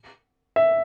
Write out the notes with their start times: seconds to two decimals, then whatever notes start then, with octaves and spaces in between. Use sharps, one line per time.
0.56 E5